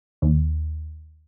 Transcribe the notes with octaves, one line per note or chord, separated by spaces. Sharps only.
D#2